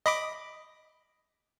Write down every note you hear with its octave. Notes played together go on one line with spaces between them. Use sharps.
D#5 B5 D6